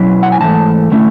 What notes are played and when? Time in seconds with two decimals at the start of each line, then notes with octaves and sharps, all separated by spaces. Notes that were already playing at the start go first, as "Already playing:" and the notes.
Already playing: B2 F#3 C#4 E4
0.23 F#5
0.32 G#5
0.40 G#2 E3 A3 A5
0.91 D3 A3 C#4 E4